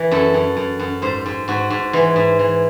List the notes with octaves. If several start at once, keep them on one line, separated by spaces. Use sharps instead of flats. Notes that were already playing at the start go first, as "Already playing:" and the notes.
Already playing: E3
F#2 A4
F#2
F#2
F#2
G#2 C5
G#2
G#2 F#4
G#2
E3 G#3
G#2
E3